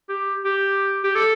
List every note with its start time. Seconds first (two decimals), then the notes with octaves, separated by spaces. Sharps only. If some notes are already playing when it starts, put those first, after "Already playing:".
0.09 G4
0.44 G4
1.04 G4
1.15 A4